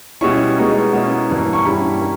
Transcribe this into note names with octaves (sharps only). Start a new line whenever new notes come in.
B2 G3 C#4 E4 C#6
B2 G#3 B3 D#4
B2 A#3 C#4 E4
G2 E3 A#3
C#6
G2 G3 C#4 E4 B5
A#3